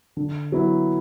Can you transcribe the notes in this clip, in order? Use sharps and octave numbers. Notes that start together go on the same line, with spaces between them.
D3
F#3 B3 E4